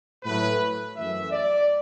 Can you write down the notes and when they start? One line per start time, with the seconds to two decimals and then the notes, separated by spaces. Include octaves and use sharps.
0.24 A2 F#3 A3 B4
0.96 F#2 E3 A3 E5
1.32 D5